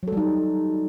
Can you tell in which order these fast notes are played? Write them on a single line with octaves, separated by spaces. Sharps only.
F#3 A4 G3 D#4